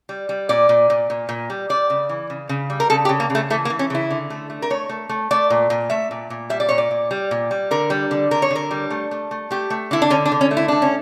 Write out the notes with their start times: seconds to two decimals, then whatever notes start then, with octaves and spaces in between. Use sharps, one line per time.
0.09 G3
0.29 G3
0.49 A#2 D5
0.69 A#2
0.90 A#2
1.10 A#2
1.29 A#2
1.50 G3
1.69 G3 D5
1.90 C#3
2.09 E3
2.30 C#3
2.49 C#3
2.70 G3
2.80 A#4
2.90 C#3 A4
3.05 G4
3.09 C#3
3.20 A#3
3.30 C#3
3.35 A3
3.50 E3 A3
3.65 A#3
3.70 E3
3.79 C#4
3.90 C#3 E4
4.10 D3
4.30 A3
4.50 A3
4.62 A#4
4.70 A3 C#5
4.89 A3
5.09 A3
5.31 A3 D5
5.50 A#2
5.70 A#2
5.90 A3 E5
6.11 A#2
6.30 A#2
6.50 G3 E5
6.60 D5
6.69 A#2 C#5
6.78 D5
6.91 A#2
7.11 G3
7.31 A#2
7.51 G3
7.71 D3 A#4
7.90 G3
8.11 D3
8.31 D3 A#4
8.42 C#5
8.50 D3
8.56 A#4
8.71 G3
8.91 A3
9.11 A3
9.31 A3
9.51 A3 G4
9.70 A3
9.91 D3 E4
10.02 D4
10.10 D3 C#4
10.26 D4
10.32 D3
10.41 C#4
10.51 A3
10.57 E4
10.68 D3 D4
10.82 C#4